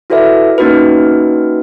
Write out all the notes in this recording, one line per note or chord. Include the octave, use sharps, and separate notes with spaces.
E4 F#4 A4 B4 D5 E5
A#3 C#4 D#4 F#4 A#4 B4